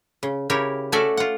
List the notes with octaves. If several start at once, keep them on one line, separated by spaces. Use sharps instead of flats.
C#3
C#3 E4 G4 A#4 C#5
A3 C#4 F#4 A4 D5 E5
F4 F#5